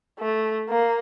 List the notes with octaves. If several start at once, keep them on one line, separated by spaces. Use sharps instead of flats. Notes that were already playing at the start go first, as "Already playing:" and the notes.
A3
A#3